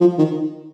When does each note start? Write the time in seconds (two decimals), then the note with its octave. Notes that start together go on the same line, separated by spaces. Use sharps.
0.01 F3
0.18 D#3